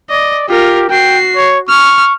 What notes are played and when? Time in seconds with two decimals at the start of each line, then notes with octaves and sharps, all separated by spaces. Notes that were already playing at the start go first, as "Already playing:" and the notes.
0.10 D5 D#5
0.48 F4 G4 A#4
0.89 F#4 G5 C7
1.36 C#5
1.69 C#6 F6